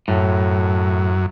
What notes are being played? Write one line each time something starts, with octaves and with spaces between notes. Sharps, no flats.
F#2 A2